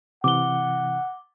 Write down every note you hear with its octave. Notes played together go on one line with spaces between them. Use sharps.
C3 E3 F#5 D6 G7